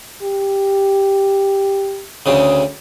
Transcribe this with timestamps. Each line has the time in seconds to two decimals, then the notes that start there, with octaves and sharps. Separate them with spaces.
0.23 G4
2.26 D2 C#3